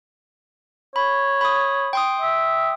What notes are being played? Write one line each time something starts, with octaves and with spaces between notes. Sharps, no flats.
C#5 B5
B5 D#6
G5 C6 D#6
E5